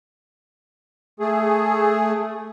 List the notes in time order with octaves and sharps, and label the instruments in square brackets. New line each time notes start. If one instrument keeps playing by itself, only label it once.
[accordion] A3 G#4